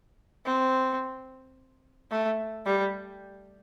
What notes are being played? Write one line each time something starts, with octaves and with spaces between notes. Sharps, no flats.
C4
A3
G3